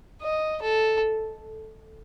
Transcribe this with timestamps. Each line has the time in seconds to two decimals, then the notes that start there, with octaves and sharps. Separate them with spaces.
0.21 D#5
0.62 A4